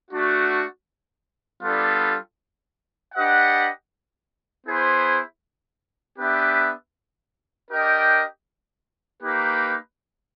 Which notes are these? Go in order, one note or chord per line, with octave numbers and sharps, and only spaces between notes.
A3 D4 F#4
G3 B3 D4 F4 A4
D4 G4 B4 D#5 F#5
B3 E4 G#4 C5
B3 D4 G4 B4 E5
D4 G4 A#4 D#5 G5
A#3 D#4 G4 B4